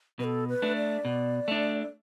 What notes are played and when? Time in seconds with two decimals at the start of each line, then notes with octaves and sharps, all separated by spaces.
0.19 B2 B4
0.24 A4
0.48 B4
0.62 A3 D4
0.77 D5
1.05 B2
1.48 A3 D4